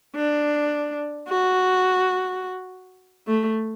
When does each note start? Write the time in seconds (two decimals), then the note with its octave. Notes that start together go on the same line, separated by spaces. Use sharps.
0.15 D4
1.29 F#4
3.28 A3